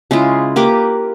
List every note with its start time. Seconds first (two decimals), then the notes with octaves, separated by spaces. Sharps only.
0.11 C#3 G#3 E4 F4
0.56 A#3 G4 B4 D6